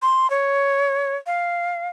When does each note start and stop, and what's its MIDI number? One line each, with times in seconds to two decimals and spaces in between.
0.02 0.30 84
0.30 1.16 73
1.26 1.88 77